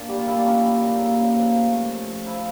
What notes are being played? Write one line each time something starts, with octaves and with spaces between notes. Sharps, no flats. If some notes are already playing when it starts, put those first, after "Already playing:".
Already playing: A#2 D4
G3 G4
F4
A#2 E4
D4
A#3 C#4
G3
A#2
C#3
C#3
F3
A3
A3
A3
F3
F3 E4